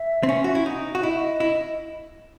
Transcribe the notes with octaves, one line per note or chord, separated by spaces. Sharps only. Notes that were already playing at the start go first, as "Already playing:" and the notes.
Already playing: E5
C4
C#4
F#4
E4
D#4
F#4
E4 D#5
E5
D#5
E4